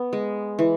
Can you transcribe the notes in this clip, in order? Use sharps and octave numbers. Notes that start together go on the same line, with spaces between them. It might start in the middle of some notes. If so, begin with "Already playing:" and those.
Already playing: B3
G#3
E3